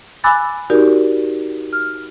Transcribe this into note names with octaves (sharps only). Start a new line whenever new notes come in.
G#5 B5 D6 E6 F#6 A6
D#4 F#4 G4 A#4 D5
F6